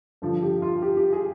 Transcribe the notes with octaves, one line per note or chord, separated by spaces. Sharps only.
G2 D3 F3
G4
F4
G4
G4
G#4